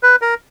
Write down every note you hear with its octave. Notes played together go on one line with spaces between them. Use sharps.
B4
A#4